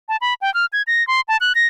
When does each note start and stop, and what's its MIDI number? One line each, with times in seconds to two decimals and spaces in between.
0.09 0.17 81
0.21 0.34 83
0.41 0.53 79
0.54 0.66 89
0.73 0.82 92
0.87 1.06 94
1.07 1.21 84
1.28 1.37 81
1.41 1.53 90
1.55 1.67 94